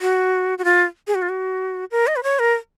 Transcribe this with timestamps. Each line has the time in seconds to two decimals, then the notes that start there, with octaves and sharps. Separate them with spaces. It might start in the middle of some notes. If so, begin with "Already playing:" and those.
0.01 F#4
0.58 F#4
0.64 F4
1.07 G#4
1.15 F#4
1.22 F4
1.29 F#4
1.91 A#4
2.07 D#5
2.16 B4
2.23 C#5
2.39 A#4